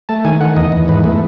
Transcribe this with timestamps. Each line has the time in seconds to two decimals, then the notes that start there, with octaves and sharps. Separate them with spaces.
0.09 A3 A5
0.25 D#3 G#5
0.41 D#3 F#5
0.56 E2 D#5
0.72 E2
0.88 G#2 B4
1.04 A3